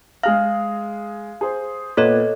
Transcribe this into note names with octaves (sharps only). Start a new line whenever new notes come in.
G#3 G#4 F5 F6
G#4 C5
A#2 B3 A4 C#5 D#5